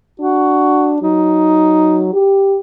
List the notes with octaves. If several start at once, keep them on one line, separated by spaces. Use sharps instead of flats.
D4 F#4
F#3 D#4
G4